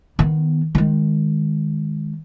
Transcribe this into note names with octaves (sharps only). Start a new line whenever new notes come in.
D#3 B3
D#3 G#3